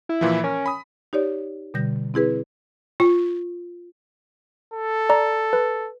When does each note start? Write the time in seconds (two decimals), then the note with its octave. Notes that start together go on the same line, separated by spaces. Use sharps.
0.09 E4
0.21 A#2 E3 F3
0.44 C#4 A#4
0.66 B5 D#6
1.13 D#4 G4 C#5 D5
1.74 B2 D3 G3 G6 A#6
2.14 C4 E4 G#4 B4
3.00 F4
4.74 A4
5.10 D5 A#5
5.53 B4